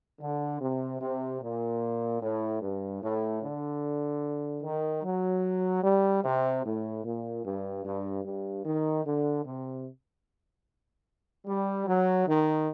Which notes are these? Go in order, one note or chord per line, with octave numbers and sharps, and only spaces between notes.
D3
C3
C3
A#2
A2
G2
A2
D3
D#3
F#3
G3
C3
A2
A#2
G2
G2
G2
D#3
D3
C3
G3
F#3
D#3